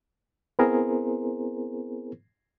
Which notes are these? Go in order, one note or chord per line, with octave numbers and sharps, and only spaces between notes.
B3 C4 E4 G#4 A#4 C5